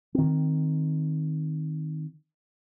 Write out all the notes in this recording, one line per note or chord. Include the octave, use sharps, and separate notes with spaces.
D#3 C4